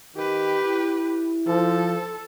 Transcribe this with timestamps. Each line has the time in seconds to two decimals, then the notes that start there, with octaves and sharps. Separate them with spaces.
0.16 D#3 G4 B4
0.65 E4
1.47 F3 A4